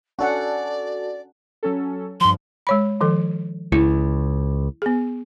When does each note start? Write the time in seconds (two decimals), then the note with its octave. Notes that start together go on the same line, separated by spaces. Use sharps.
0.19 C#4 D4 F#4 A4 D5 F#5
1.63 F#3 C#4 A4
2.21 G2 F3 C6
2.67 G#3 C#5 B5
3.01 D#3 F3 A4
3.72 C#2 E4
4.82 B3 G#4